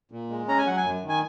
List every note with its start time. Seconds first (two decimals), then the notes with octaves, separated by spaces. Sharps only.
0.12 A#2
0.30 G#3
0.48 C#4 A#5
0.58 G#5
0.66 F#3 F#5
0.77 G#5
0.84 F#2
1.02 D#3
1.09 G#5